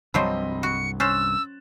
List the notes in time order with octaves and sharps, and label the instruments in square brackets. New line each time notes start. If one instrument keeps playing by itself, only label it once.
[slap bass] C2 G2 [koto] F3 F#3 C5 [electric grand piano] C4 D#5 B5
[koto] F#4 [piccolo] C#7
[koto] C#4 C5 [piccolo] E6 [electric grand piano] F#6 A6 E7